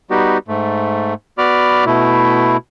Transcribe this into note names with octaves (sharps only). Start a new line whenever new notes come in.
G3 B3 D#4 F#4 G4
G#2 A3
B3 F#4 D5 B5 D6 F6
B2 A3 E4